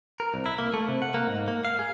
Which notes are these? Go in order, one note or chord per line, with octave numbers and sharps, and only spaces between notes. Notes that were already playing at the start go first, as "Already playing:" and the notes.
A#4
C2
E4
A#3
A3
C3
F#5
A#3
G#2
A#3
F5
G#4